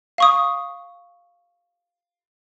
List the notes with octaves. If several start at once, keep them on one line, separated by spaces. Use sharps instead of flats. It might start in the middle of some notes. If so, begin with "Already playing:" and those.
F5 C#6 D#6